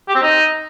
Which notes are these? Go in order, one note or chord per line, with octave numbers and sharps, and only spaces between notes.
G4
C4
D#4